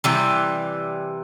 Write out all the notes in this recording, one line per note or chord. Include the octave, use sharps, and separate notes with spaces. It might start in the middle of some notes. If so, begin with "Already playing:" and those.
C3 E3 G3